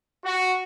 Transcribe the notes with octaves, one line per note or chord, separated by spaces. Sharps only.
F#4